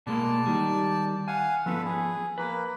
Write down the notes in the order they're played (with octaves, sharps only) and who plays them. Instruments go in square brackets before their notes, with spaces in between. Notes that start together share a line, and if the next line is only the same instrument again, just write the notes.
[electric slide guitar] B2 G#3 A#3 [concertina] D5 A5
[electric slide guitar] D#3 G3
[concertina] F5 F#5 [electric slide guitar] G#5
[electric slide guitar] F3 B3 [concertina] A4 B4
[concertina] G#4
[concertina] A#3 [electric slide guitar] B4